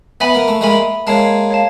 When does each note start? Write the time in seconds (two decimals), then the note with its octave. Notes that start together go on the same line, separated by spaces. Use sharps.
0.20 B3 E5 G#5 B5
0.35 A#3
0.48 A3
0.61 G#3 A#3 E5 G#5 B5
1.07 G#3 A#3 C#5 F5 A5
1.50 C#5 F5 A5